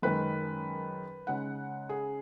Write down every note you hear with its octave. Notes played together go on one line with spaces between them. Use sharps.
F#2 D#3 G#3 B4
C#3 G#3 D#4 F#5
G#4